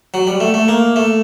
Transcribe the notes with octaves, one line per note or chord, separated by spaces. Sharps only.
F#3
G3
A3
A3
A#3
A3